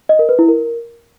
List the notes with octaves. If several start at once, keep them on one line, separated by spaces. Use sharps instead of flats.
D#5
A#4
B4
E4
A#4